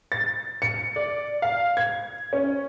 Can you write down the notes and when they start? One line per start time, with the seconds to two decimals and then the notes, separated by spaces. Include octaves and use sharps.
0.12 A6
0.62 C#7
0.96 D5
1.42 F5
1.77 G#6
2.33 C#4